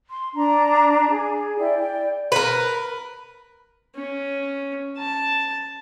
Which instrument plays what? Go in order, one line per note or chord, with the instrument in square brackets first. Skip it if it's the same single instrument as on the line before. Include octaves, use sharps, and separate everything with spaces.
[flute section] C6
D4 A#5
G#4
E4 D5 G5
D5 G5
[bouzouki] A#4 B4
[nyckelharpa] C#4
A5